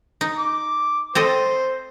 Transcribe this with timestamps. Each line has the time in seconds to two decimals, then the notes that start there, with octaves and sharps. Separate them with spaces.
0.21 D#4
0.38 D6
1.15 C4 A4 C5 D#5